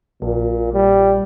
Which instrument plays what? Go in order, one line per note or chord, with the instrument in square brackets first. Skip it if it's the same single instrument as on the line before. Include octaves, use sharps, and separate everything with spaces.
[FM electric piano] A#1 [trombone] A#2
[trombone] G3